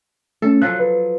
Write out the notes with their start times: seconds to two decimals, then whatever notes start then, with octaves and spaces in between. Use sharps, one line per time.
0.42 A3 C#4 A4
0.62 F3 F#3 A4 F#6
0.79 B4